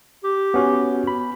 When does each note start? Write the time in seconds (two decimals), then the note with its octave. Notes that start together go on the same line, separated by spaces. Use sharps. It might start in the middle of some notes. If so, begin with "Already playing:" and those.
0.24 G4
0.54 B3 C#4 F#4
1.07 B5